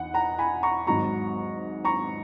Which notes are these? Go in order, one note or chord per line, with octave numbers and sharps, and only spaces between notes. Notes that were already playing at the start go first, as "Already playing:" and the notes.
Already playing: E2 D#4 F#5
F#5 A#5
G#5 B5
A#5 C#6
G#1 G#2 F#3 A#5 C#6
A#5 C#6